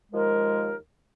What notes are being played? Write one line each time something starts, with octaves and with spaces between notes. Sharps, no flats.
D#2 F3 G#3 A#4